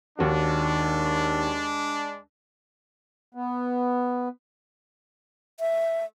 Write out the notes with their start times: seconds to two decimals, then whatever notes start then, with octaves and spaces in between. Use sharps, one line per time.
0.19 D#2 D#3 G#3 D4 F#4
3.34 B3
5.60 E5